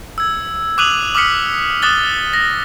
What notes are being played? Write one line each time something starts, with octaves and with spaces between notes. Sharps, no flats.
E6 G#6
D6 D#6 F#6 D#7 F7 F#7
D6 D#6 F6 B6 C#7
D6 D#6 F#6 A6 G7
A#6